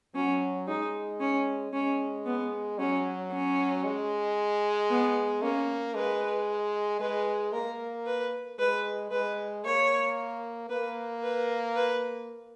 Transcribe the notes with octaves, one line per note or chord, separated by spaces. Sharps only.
F#3 C#4
G#3 D#4
C#4
G#3 C#4
B3
F#3 C#4
C#4
G#3
B3
A#3 C#4
G#3 B4
G#3 B4
A#3 A#4
B4
G#3 B4
G#3 B4
A#3 C#5
A#3 B4
B4
B4